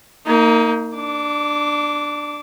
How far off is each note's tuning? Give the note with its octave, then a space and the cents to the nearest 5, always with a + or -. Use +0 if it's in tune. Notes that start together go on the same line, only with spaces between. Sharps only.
A#3 -20 D#4 +20
D4 +10 D6 -20